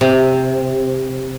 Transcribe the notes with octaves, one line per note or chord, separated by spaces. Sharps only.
C3